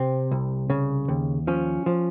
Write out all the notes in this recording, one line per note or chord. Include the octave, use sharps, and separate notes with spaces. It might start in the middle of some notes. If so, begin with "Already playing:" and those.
Already playing: C3 C4
C2
C#3
D#2
F3 C#4
F3